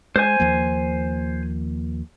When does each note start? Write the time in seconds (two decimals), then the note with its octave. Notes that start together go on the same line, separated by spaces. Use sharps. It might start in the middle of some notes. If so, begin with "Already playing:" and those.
0.16 G#3 C5 G#5
0.40 D#2 F3 A#3